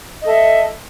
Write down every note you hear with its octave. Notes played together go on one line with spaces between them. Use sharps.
A4 D#5 E5